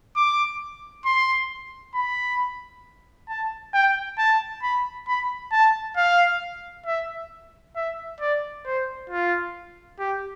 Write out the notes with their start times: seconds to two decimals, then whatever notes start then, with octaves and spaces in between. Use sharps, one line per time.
0.16 D6
1.05 C6
1.95 B5
3.29 A5
3.74 G5
4.18 A5
4.63 B5
5.08 B5
5.52 A5
5.97 F5
6.86 E5
7.76 E5
8.21 D5
8.66 C5
9.10 F4
9.99 G4